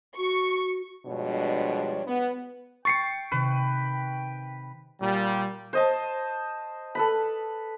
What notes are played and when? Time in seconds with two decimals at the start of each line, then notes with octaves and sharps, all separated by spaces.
0.17 F#4 C#6
1.06 G2 B2 F3 G#3 D4 C#5
2.07 B3
2.85 G5 C#6 A6 C7 C#7
3.32 C3 D#3 B4
5.01 A#2 G3
5.73 C5 D#5 A5
6.95 A4 B4 B5